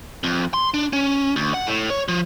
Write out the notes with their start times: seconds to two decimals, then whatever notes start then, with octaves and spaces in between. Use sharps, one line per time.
0.24 F2
0.54 C6
0.74 D4
0.93 C#4
1.36 D2
1.54 F#5
1.67 A2
1.90 C#5
2.08 F3